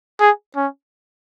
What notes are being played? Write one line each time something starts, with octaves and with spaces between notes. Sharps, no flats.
G#4
C#4